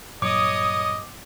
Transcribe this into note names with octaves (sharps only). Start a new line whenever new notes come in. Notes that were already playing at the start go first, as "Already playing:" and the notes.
G2 A#2 F#3 C#5 D#5 D6 D#6